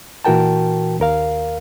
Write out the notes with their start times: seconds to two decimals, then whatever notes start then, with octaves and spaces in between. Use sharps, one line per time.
0.25 A#2 E3 F#4 A#4 G5 A5
1.00 D#2 A#4 F5